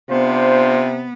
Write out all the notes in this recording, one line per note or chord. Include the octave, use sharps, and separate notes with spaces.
C3 B3 D4 F4 C5